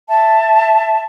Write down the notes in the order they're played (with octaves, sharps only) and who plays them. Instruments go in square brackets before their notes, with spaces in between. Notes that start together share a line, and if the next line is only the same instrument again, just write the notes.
[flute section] E5 A5